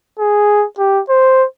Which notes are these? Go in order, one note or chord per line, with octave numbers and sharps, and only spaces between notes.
G#4
G4
C5